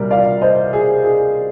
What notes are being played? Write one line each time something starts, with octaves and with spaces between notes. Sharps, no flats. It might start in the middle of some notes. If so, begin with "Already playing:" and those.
Already playing: C2 A#2 G3 A#4 D5
D5 F5
C5 D#5
G#4
G#4